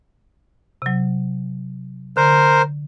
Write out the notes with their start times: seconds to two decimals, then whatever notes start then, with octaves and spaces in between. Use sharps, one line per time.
0.82 C3 F#3
2.17 D3 A#4 C5